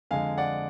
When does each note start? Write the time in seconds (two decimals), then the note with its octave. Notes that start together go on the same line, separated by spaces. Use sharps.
0.11 F2 D3 G#3 F5 G#5
0.38 D5 F#5